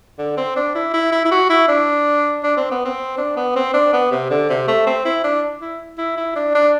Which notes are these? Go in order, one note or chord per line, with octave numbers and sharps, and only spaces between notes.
D3
C4
D4
E4
E4
E4
E4
F#4
E4
D4
D4
C4
B3
C4
D4
B3
C4
D4
B3
C3
D3
C3
A3
C4
E4
D4
E4
E4
E4
D4
D4